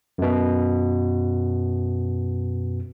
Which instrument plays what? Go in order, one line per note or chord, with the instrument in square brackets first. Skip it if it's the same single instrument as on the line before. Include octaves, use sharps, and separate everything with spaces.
[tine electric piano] F#2 B2